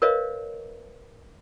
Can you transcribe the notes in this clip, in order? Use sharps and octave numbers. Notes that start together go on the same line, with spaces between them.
A#4 B4 C#5 D#5 F5